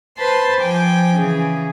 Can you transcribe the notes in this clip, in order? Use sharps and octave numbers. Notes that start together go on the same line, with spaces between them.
B4 C5 A5 B5 C6
F3 G5 G#5 D6
C#3 E3 G#4